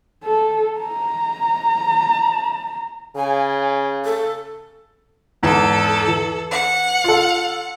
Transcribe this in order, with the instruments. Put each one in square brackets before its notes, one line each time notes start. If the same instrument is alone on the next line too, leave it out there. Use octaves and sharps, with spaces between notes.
[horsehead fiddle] A4
A#5
[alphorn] C#3 [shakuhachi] G#5
[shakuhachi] A4
[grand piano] E2 G#2 [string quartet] A4
[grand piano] E3
[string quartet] F#5
[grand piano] F4 A4